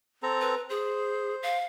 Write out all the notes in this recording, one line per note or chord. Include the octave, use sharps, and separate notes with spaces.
C4 A4 A#5
B4
G#4 C5
F5